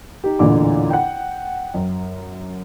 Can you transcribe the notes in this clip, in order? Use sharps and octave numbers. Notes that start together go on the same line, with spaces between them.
D#4 G4
A1 E2 A#2 D3 D6
F#5 G5
F#2